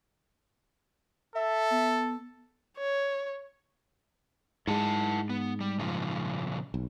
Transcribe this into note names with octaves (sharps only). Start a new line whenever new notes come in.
A4 E5
B3
C#5
G#2 G#3 E4 F#5 A5
B3
G3
A#2 C#3 F3
B1